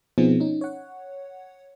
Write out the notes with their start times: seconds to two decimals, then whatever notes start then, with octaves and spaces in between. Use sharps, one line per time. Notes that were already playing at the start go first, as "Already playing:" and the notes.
0.18 B2 F3 B3 C4 D#4 G#4
0.40 C#4 D#4
0.61 C#5 F#5